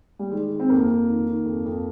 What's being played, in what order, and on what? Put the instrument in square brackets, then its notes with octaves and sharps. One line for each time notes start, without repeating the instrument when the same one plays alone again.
[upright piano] G3
D#3 G#3
D#3
C4
F2 A#3
F2
D#3
D#3
F2
F2